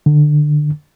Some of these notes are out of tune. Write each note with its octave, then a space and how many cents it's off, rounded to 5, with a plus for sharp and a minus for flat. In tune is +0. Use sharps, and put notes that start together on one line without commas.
D3 +20